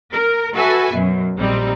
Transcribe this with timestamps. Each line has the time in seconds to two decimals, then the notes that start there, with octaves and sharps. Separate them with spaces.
0.12 A#4
0.55 F#4 A4 B4 E5 G#5
0.93 F#2 B2
1.37 A#1 G3 C4 D#4